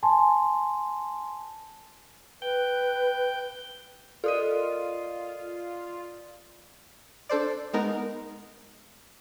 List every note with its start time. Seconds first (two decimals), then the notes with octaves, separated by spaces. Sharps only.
0.03 G#5 A5 C6
2.42 B4 G5 G6
4.24 F4 A4 A#4 D5 D#5 D#6 D#7
7.29 D4 A4 C5 D5
7.73 G#3 B3 D#4 A#4